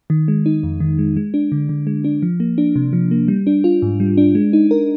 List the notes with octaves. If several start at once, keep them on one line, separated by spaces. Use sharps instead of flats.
D#3
G#3
D#4
F2
D#3
G#3
G#3
D4
D3
D3
G#3
D4
F3
A#3
D4
C3
F3
A#3
G3
D4
F4
G#2
G3
D4
G#3
D#4
A#4